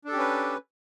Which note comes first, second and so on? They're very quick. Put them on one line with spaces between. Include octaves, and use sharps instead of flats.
D4 A4 G4 C#4 B4